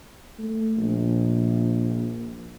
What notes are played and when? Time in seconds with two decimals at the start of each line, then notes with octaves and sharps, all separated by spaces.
0.39 A3
0.77 A#1